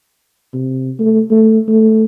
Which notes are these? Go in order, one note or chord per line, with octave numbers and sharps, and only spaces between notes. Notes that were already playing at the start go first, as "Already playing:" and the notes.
C3
A3
A3
A3